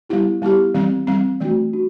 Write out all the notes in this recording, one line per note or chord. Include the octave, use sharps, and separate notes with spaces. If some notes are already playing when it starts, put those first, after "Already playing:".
G3 B3 E4 G4
G3 B3 E4 G4
E3 G3 C4
E3 G3 C4
E3 A3 D4 F#4
D4 F#4